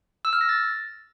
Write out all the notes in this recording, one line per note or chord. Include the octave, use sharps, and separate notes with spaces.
E6
F6
A#6
A6